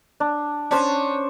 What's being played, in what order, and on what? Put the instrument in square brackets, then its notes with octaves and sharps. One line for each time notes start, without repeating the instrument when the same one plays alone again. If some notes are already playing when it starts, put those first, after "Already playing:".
[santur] D4
[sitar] C#4 [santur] D4 C5